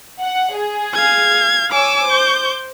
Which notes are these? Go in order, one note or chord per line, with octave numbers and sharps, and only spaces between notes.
F#5
G#4
F5 G#6
C#5 G#5 D6 E6
C5 G6